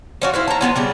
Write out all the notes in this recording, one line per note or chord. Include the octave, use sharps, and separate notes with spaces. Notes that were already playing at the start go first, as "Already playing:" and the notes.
F3 C#4 F#4
E4 C5 F5
A5 A#5
F3 G3 B3 C#4
C#3 G3 D5